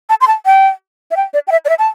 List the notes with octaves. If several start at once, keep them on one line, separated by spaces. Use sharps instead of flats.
A5
C6
A5
G5
E5
G5
D5
G5
E5
D5
E5
A5